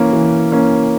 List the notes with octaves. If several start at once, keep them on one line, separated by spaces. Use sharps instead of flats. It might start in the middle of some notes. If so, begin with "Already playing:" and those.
Already playing: E3 A#3 C#4
E3
A#3 C#4